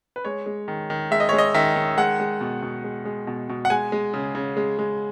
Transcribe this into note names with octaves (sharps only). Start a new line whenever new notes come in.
B4
G#3 C#5
G#3
D#3
D#3
G#3 E5
D#5
G#3 C#5
D#5
D#3 E5
D#3
G#3 F#5
G#3
B2
B2
G#3
G#3
B2
B2
F#5
G#3 G#5
G#3
C#3
C#3
G#3
G#3